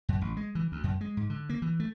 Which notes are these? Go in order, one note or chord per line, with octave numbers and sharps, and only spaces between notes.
F#2
A1
G#3
E3
D2
F#2
G#3
G#2
D3
A#3
E3
A3